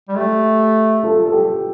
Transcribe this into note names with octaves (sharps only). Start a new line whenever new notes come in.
G3
A3 G4
F4 A4
A4
G4